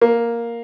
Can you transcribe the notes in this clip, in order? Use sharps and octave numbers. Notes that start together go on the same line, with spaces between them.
A#3